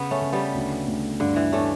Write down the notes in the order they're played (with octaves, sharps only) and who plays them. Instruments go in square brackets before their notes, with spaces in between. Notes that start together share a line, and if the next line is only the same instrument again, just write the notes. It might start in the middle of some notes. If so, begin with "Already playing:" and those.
Already playing: [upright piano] C#3 [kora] B3
[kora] A3 C#4
[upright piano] C#3
[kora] G3 B3
[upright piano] D2
D2
[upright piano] G2 [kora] D3
[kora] E3
[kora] A3 C#4 [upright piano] D4